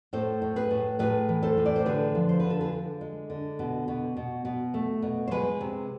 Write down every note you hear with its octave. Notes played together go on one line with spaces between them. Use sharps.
A2 A4 C5
A2
G#4 B4
A2
A2 G#4 B4
E3
A4 C5
A2
D5
C5
D3 G#4 B4
F3
C5
D3 B4
A4
G#4 B4
D3
G#3
D3
B2
B2
B2
B2
A3
B2
C5
G#3 G#4 B4
C3